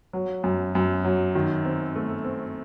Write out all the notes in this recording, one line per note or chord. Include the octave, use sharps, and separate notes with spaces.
F#3
F#2
F#2
F#3
D#3
C4
A3
C4